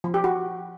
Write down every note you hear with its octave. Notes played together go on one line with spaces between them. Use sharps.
F3
G4
F#4